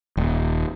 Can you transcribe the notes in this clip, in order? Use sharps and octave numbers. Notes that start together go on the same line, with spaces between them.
D#1